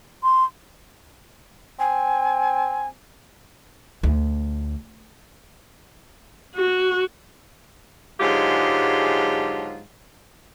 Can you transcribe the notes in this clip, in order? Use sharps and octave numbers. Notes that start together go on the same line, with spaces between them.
C6
C4 G#5
D2
F#4
G#2 D3 F#3 G#3 F4 G4